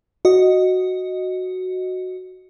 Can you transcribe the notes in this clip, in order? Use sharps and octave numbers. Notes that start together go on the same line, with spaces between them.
F#4 D#5